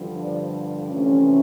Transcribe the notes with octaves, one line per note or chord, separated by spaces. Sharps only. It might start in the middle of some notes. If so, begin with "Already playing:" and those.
Already playing: G2 D3 F3
C5 D5
D2 C3 E3 A3 C#4